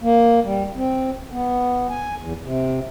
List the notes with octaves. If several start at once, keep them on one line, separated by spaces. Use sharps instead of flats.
A#3
G3
C4
B3
G#5
E2
C3